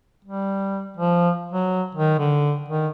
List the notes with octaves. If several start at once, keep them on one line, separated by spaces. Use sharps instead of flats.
G3
F3
F#3
D#3
D3
D#3